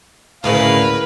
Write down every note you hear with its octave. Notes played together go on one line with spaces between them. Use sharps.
D2 A2 C#3 E4 A#4 B4 F5